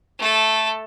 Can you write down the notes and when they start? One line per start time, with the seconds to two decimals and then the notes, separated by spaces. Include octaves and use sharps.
0.19 A3 A4